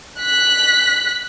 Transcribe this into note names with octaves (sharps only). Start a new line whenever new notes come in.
F#6 B6